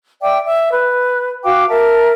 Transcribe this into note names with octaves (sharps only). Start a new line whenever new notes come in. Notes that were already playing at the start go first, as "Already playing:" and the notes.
D5 E5 G5 D6
E5
B4
F#4 F5 G5 D6
A#4 E5 A5